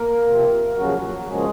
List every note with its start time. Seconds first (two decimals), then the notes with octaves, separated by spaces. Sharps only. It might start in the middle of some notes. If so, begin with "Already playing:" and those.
Already playing: A#3 A#4
0.26 C3 F3 C4
0.76 D#2 C#3 F3 F#3 A#3 C#4 F#4
1.02 F#3 F#4
1.27 C#3 F3 G#3 A#3 C#4 G#4